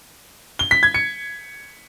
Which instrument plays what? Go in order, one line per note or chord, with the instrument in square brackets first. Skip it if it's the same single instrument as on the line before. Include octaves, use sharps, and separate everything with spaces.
[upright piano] G7
B6
G#6
C#7